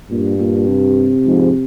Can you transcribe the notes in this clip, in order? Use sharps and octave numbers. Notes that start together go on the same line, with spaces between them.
G2 A#2
A#2
C3
F2 G#2